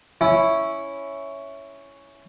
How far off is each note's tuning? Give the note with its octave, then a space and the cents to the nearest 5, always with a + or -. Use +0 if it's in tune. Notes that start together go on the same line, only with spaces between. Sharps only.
C#4 +5 E4 +0